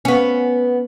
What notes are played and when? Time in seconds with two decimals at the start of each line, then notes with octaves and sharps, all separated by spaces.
0.05 B3 C#4